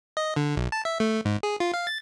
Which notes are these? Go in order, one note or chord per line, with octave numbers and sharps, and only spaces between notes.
D#5
D3
B1
A5
E5
A3
G#2
G#4
F4
F5
A6